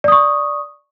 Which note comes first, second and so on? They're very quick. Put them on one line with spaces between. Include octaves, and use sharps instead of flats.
D5 D#6 C#6